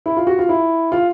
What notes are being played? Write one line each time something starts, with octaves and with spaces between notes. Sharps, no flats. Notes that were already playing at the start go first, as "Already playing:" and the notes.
E4
F4
F#4
F4
E4
F4